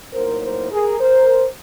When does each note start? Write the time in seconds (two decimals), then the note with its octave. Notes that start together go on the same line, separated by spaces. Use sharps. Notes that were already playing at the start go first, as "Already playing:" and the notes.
0.13 A2 F#3 A#3 D#4 A#4 C5
0.42 A#4 C5
0.71 G#4 A#4
1.00 A#4 C5